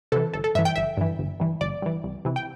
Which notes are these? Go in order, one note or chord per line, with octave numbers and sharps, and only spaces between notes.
C3 E3 A4
G1 A4
A4
G2 E3 E5
G5
G1 E5
G2 E3
G1
G2 E3
G1 D5
G2 E3
C2
C3 E3
G5